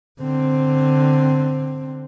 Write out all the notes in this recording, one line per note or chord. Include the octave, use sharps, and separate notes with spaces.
D3 C4